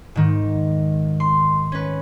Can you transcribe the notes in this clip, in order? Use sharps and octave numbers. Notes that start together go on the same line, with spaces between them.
G#2 D#3
C6
C#4 B4